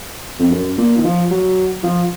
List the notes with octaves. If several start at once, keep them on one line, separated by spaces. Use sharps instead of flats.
F2
F#2
A#2
D#3
F3
F#3
F3